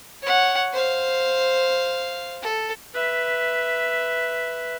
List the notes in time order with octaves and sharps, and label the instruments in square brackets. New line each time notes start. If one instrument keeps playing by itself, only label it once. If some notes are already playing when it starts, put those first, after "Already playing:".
[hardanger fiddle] C#5 F#5
C5 F5
A4
[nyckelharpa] B4 E5